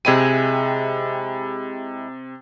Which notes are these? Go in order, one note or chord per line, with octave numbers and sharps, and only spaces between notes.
C3 G#3 E4 G4 D#7